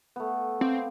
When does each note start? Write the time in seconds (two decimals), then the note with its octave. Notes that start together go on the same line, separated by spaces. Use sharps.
0.16 A3 B3
0.61 C4 F5 D6